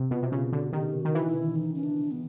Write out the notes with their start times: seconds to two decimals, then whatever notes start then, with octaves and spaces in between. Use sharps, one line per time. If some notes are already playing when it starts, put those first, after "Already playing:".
Already playing: C3
0.11 B2 F4
0.23 C3
0.32 C#3 F4
0.52 D3 F#4
0.72 D#3 G4
1.00 D#3 F#4
1.15 E3
1.28 E4
1.56 D#4
1.75 C#4
1.83 D4
2.11 B3